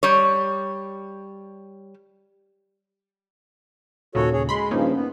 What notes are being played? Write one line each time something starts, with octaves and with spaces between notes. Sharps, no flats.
G3 C#5
D#2 A#2 C#3 F#4 A4 C#5
G#4 C#5
G#3 B5 C6
G2 C#3 F3 A#3 C#4 D#4
B3